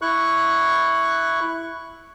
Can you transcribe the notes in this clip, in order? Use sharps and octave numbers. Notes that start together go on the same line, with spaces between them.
E4 C#6 F#6